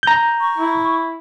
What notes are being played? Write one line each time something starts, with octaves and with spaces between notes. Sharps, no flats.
A#5 G6
C#6
E4